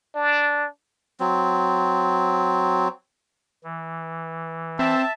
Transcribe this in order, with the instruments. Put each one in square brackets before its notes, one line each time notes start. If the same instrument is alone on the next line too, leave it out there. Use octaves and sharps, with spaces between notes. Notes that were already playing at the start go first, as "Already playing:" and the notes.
[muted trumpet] D4
[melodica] F#3 C4
[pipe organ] E3
[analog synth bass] C4 [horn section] E5 A5